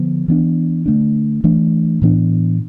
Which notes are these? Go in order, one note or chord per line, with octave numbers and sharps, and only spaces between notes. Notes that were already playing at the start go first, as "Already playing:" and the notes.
Already playing: D3 F3 B3
E3 B3 D4
D3 A3 D4
E3 A3 D4
A2 E3 B3 D4